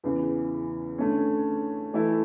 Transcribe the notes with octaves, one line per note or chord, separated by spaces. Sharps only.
E2 C#3 E3
D3 A3 C#4
E3 A3 E4 A4